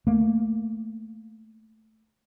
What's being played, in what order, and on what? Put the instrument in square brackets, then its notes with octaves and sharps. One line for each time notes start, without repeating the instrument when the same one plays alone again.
[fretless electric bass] A3 A#3